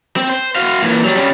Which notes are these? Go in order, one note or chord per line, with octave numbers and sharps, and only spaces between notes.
C4
C5
F#4 F5
A#2 E3
F#3 G3
C#3 G3